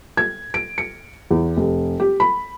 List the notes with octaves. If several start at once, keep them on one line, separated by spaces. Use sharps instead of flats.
G#6
D7
C#7
E2
F1
G4
B5